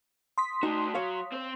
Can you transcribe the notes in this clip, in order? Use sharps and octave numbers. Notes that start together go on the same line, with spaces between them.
C6 D#6 B6
A3 D#4 F#4
F#3 C#5 F5
C4 C5